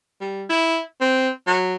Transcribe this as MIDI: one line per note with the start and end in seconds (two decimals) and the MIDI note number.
0.21 0.43 55
0.49 0.81 64
1.01 1.28 60
1.47 1.76 54